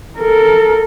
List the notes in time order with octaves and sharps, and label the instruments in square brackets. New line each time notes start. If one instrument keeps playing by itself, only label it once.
[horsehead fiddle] A4 A#4